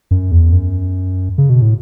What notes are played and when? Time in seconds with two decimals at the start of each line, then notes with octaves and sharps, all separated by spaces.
0.11 F#2
0.31 E2
0.53 F#2
1.38 C#3
1.50 B2
1.62 A2